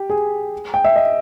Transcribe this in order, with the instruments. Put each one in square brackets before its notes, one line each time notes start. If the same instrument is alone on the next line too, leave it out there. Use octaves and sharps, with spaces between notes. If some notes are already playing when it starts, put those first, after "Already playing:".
Already playing: [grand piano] G4
G#4
G5
E5
D#5